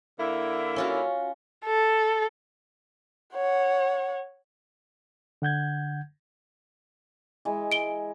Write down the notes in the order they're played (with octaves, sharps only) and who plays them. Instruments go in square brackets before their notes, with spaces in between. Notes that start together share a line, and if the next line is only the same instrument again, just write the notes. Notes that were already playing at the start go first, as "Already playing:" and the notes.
[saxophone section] D3 A#3 E4
[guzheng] C#4 F4 F#4
[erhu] A4
[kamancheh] C#5 F#5
[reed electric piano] D3 F#5 G6 G#6
[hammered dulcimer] E3 G#3
[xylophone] D7 G7